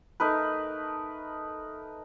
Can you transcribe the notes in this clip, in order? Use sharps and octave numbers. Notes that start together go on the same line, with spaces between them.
A3 D#4 A#4 B4